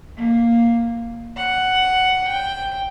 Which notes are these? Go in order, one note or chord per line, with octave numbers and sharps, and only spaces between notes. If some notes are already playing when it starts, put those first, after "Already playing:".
A#3
F#5
G5